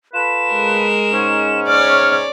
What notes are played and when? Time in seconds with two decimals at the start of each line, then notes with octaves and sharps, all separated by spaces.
0.14 F4 A4 B4 E7
0.50 G#3 A#4
1.13 G#2 C#4
1.68 C#5 D5 F6